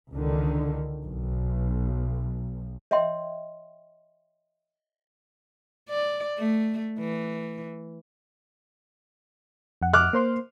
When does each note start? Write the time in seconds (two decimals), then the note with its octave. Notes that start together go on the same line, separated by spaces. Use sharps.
0.12 C#2 D3 D#3
1.04 B1
2.91 C#5 D#5 E5 G5 C6
5.90 D5
6.38 A3
6.99 E3
9.82 F2 F#5
9.94 D6 F6 F#6
10.13 A#3 C5 C6